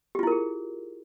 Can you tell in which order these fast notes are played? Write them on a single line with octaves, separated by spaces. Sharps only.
G4 F4 E4 A#4 G#4